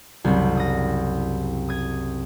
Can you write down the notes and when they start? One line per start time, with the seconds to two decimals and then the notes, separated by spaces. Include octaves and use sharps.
0.25 F#1 C2
0.57 D#6 A#6
1.69 D#6 G#6